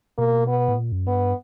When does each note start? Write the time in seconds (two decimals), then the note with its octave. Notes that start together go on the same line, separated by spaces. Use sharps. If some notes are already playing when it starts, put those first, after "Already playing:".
0.18 B2 A#3
0.47 B3
0.68 A2
0.77 A#2
0.92 F#2
1.07 G2 B3